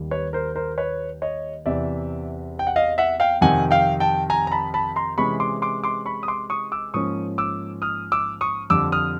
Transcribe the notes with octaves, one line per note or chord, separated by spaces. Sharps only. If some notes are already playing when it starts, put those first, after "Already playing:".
Already playing: D#2 D#3 G3
B4 C#5
A#4 C5
A#4 C5
B4 C#5
C#5 D#5
E2 C3 E3 D5 E5
G5
F#5
D#5 F5
E5 F#5
F5 G5
F2 C3 D#3 F#5 G#5
F5 G5
G5 A5
G#5 A#5
A#5
A5 B5
A5 B5
A#5 C6
C3 E3 G#3 C#4 B5 C#6
C6 D6
C6 D6
C6 D6
B5 C#6
D#6
C6 D6
C#6 D#6
D6 E6
G#2 F3 A#3 C#4 C#6 D#6
D6 E6
D#6 F6
D6 E6
C#6 D#6
F2 D3 G3 D6 E6
D#6 F6